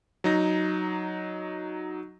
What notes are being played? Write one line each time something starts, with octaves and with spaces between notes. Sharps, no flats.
F#3 D#4 A#6